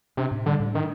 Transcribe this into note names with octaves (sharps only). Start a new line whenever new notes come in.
C3 D4
A2
D3 G3
A2
D#3 D4